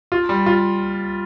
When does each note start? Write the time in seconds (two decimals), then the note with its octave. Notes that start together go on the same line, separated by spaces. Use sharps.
0.12 F4
0.29 G3
0.46 F4